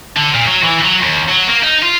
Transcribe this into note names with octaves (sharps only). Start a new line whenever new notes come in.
D3
A#2
F#3
E3
F#3
D#2
F#3
A#3
D#4
F4